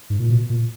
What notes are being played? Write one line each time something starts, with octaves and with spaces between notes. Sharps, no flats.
G#2
A#2
B2
A#2